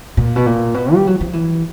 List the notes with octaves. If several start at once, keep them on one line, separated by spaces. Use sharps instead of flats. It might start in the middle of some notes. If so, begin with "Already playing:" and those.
A#2
B2
A#2
B2
G3
F#3
F3
E3